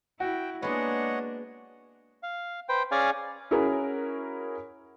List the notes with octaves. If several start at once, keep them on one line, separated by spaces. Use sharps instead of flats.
E4 F#4 G5
G#3 A#3 B3 D4 C#5 D#5 F#5
F5
B4 C5 G5
C#4 G#4 D5 F5 G#5
C#4 E4 F#4 G#4 A#4 C#5